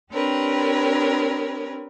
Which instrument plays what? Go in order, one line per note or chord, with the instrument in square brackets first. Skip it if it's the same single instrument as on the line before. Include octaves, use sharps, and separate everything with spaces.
[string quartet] C4 D4 G4 A#4 B4 C#5